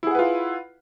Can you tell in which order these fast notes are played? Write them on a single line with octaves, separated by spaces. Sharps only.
E4 G#4 F#5 B4 F4